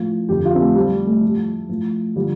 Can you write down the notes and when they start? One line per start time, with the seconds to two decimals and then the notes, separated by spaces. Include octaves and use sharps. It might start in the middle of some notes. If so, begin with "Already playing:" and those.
Already playing: A2 F3
0.28 F2 D3 F3 G4
0.45 F4
0.55 C4
0.60 A3
0.75 A2 F3 G3
1.06 A3
1.22 A2 F3
1.69 A2 F3
2.16 D3 F3 G3